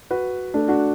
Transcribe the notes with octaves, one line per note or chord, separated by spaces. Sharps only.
F#4 B4
A3 D4
D4 F#4